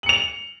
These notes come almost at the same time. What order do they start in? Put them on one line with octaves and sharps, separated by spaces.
F#7 C#7 F7